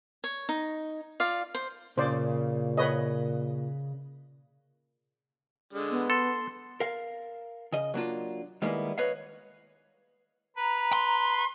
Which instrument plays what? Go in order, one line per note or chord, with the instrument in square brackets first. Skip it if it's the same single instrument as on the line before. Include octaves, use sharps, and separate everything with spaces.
[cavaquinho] C#5
D#4
F4 D5 F5
C5
[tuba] A#2 [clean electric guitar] C#3 [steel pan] C5 D5
[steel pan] B4 C#5 D#5
[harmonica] D3 G#3
[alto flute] B3
[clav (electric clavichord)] A4 [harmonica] C6
[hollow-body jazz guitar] A#4 F5
C#3 D#5
F#3 A#3 D4 F4
D#3 G3 G#3 A#3 B3 E4
B4 C#5 D#5 F5
[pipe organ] B4 [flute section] A#5
[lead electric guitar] C6